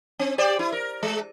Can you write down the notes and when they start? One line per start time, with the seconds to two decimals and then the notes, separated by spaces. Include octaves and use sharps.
0.19 C4
0.38 G4 C5 D5
0.59 E4
0.72 A#4
1.03 G#3